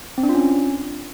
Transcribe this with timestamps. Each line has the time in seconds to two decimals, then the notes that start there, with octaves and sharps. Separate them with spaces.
0.18 C4
0.23 D4
0.29 F4
0.35 C#4